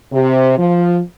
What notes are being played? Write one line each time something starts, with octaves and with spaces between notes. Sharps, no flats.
C3
F3